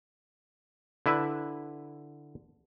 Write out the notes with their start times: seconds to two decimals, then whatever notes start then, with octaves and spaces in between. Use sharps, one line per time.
1.06 D3 E4 B4 E5